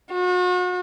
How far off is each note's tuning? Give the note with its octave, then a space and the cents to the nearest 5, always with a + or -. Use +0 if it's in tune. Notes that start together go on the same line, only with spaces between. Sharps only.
F#4 -40